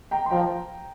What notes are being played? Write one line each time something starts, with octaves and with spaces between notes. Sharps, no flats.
G5 A#5
C6
F3 G5 A#5